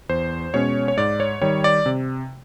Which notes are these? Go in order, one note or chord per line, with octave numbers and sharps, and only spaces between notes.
E2 C5
B2 G#3 C#4 C#5
C#5
G#2 D5
C#5
D#3 G3 C#5
D5
C3